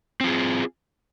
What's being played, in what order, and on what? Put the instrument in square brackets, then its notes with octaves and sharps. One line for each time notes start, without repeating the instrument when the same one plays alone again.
[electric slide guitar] C4
F4
G#4